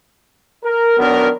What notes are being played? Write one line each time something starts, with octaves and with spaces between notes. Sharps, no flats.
A#4
D#3 F#3 B3 D4 A#4